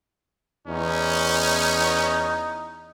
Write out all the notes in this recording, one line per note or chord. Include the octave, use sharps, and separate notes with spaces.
E2 C#4 D#4